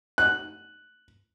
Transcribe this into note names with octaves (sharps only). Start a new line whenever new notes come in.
F#6